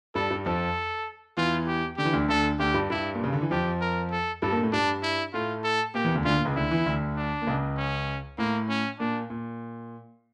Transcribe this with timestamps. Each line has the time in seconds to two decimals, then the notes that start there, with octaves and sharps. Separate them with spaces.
0.15 G2 G3 A4
0.30 G2 G3
0.46 F2 F3 A4
1.37 E2 E3 F4
1.67 G4
1.98 D3 G4
2.05 E3
2.13 D2 D3
2.29 D2 D3 A4
2.59 D2 D3 G4
2.74 G2 G3
2.90 G2 G3 E4
3.15 A#2
3.24 C#3
3.33 D3
3.42 E3
3.51 F2 F3 G4
3.81 A#4
4.11 A4
4.42 G2 G3 A4
4.52 A#2 A#3
4.63 A2 A3
4.72 G2 G3 D4
5.03 E4
5.33 A2 A3 F4
5.64 A4
5.94 A#2 A#3 G4
6.04 E2 E3
6.15 D2 D3
6.25 D2 D3 F4
6.36 A#2
6.45 C#2 C#3
6.56 D2 D3 E4
6.71 E2 E3
6.86 D2 D3
7.16 D4
7.42 A#2
7.47 C#2 C#3
7.77 C#4
8.38 A2 A#3
8.69 C#4
9.00 A#2 D4
9.30 A#2